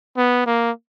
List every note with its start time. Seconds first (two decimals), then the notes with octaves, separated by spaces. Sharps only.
0.17 B3
0.46 A#3